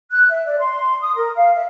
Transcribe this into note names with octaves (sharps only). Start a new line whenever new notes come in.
F#6
E5
D5
C6
D#6
A#4
F5
E5